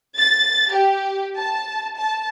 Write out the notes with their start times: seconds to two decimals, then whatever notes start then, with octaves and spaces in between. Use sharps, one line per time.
0.16 A6
0.71 G4
1.35 A5
1.95 A5